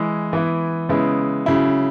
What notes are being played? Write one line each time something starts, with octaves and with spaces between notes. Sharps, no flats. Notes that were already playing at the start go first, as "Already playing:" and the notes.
Already playing: E3 G#3 E4
E3 B3 E4
C#3 G#3 B3 E4
C#3 F#3 E4